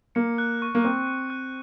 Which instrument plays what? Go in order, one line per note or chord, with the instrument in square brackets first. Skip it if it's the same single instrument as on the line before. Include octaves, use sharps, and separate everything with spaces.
[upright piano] A#3 [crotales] C#7
[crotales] F#6
C#6
[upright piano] A#3
[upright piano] C4 [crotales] C#6
[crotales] C#7
F#6